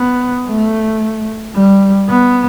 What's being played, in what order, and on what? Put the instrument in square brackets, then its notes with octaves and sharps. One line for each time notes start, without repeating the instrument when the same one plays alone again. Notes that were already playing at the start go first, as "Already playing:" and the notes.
Already playing: [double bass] B3
A3
G3
B3